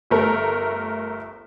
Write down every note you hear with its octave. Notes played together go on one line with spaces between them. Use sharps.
G1 A3 A#4